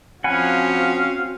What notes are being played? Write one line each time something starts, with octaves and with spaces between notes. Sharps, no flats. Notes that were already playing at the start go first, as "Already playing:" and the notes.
F3 C4 C#4 F#4 F5 F#5 G#5 B5